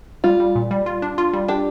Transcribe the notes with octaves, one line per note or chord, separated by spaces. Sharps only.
G3 F4
G3
A#2
G3
F4
D4
F4
G3
D4 G4